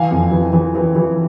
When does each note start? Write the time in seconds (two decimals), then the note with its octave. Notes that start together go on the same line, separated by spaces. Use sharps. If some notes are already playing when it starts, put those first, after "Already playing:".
Already playing: E3 F5 G#5
0.11 F2
0.31 E3
0.53 E3
0.75 E3
0.95 E3